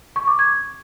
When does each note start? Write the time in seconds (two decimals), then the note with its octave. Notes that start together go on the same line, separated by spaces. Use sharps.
0.16 C#6
0.27 D6
0.39 G#6